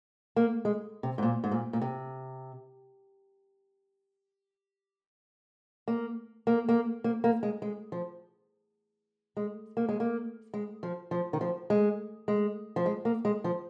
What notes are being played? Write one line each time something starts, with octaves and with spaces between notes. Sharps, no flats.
A#3
G#3
C3
G#2
A#2
G#2
A#2
A#2
C3
A#3
A#3
A#3
A#3
A#3
G#3
G#3
F3
G#3
A#3
G#3
A#3
G#3
F3
F3
D#3
F3
G#3
G#3
F3
G#3
A#3
G#3
F3